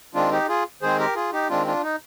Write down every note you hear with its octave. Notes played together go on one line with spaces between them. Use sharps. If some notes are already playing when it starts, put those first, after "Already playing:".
D#3 G#3 C4 D4 F4
D#4 G4
F4 G#4
D#3 G#3 C4 G#4 C5
G4 A#4
F4 G#4
D#4 G4
D#3 G#3 C4 D4 F4
D4 F4
D#4